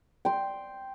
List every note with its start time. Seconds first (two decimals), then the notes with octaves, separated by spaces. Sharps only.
0.25 G5 C6